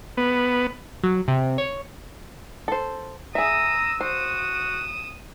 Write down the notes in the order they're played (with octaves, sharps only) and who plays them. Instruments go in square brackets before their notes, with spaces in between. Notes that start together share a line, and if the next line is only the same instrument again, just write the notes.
[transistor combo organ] B3
[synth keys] F#3
C3
C#5
[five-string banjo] A4 C5
[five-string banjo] G#4 E5 [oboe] A#5 [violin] D#6 E6
[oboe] F#4 [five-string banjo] C5 [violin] D#6 E7